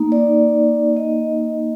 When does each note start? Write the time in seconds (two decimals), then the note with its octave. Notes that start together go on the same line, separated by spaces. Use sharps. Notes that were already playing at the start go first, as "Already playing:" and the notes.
Already playing: A#3 D#4
0.12 D5
0.96 D#5